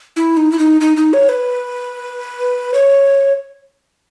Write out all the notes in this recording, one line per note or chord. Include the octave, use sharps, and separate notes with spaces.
E4
D#4
E4
D#4
D#4
D#4
C#5
B4
C#5